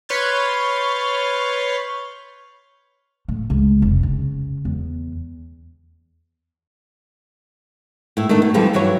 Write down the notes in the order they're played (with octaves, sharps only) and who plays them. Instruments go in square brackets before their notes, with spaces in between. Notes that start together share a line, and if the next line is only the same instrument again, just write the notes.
[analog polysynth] B4 C#5 C6 F6 G6 A6
[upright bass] A2
C#2
F1
C#3
E2
[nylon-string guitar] A2 E4
D#3 A3 D4 D#4
B2
D#2 E3 F3 G3 C4 A4
G2 E3 F#3 E4 C#5